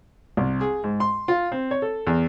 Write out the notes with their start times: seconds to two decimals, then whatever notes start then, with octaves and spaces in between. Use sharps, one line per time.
0.37 C2
0.61 G#4
0.84 G#2
1.00 C6
1.28 F4
1.52 C4
1.71 C#5
1.82 A4
2.07 E2